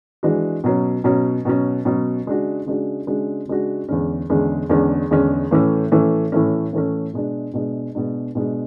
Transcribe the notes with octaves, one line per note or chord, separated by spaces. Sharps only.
E3 G#3 D4 F#4
B2 F#3 C#4
B2 F#3 C#4
B2 F#3 C#4
B2 F#3 C#4
C#3 G#3 D4 F#4
C#3 G#3 D4 F#4
C#3 G#3 D4 F#4
C#3 G#3 D4 F#4
E2 D3 G#3 C#4
E2 D3 G#3 C#4
E2 D3 G#3 C#4
E2 D3 G#3 C#4
A2 E3 A3 C#4
A2 E3 A3 C#4
A2 E3 A3 C#4
A2 E3 A3 C#4
B2 G#3 D4
B2 G#3 D4
B2 G#3 D4
B2 G#3 D4